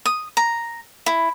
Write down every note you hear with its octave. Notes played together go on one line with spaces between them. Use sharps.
D#6
A#5
E4